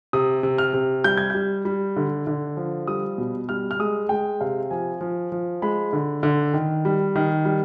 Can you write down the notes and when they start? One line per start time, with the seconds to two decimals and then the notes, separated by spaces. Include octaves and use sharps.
0.13 C3 D#6
0.43 C3
0.58 F6
0.74 C3
1.04 G3 G6
1.18 G#6
1.30 G3 G6
1.65 G3
1.96 D3
2.27 D3
2.57 F3
2.87 G3 D#6
3.18 B2
3.49 G3 F6
3.71 F6
3.79 G#3 D#6
4.09 G#3 G5
4.41 C3 F5
4.71 F3 G#5
5.01 F3
5.32 F3
5.62 G#3 B5
5.93 D3
6.23 D3
6.54 D#3
6.85 G3
7.16 D#3
7.45 G3